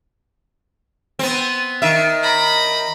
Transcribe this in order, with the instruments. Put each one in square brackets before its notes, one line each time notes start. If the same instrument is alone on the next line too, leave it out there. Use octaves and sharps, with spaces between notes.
[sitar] B3 C4
D#3 E5
[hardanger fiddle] A#5 B5